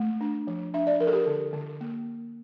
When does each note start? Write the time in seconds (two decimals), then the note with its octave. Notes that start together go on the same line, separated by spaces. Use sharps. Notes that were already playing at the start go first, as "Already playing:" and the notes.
Already playing: A3
0.21 D4
0.47 F3
0.74 D4 E5
0.87 D5
1.00 F3 A#4
1.07 A4
1.13 G4
1.27 D3
1.53 D3
1.81 A#3